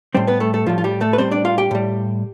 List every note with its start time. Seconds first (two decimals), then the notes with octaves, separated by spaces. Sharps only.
0.14 A2 G3 C4 C5
0.27 B3 B4
0.40 A3 A4
0.54 A3 A4
0.66 A2 F3 G3 F4
0.78 F4
0.84 G3 G4
1.01 A3 A4
1.13 B4
1.18 A2 G3 C4 C5
1.31 D4 D5
1.45 F4 F5
1.58 G4 G5
1.71 A2 G3